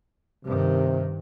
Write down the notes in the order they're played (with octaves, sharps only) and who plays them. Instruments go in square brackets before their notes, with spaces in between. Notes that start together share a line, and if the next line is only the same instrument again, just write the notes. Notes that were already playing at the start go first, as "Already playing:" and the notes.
[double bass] G2 D#3 [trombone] C3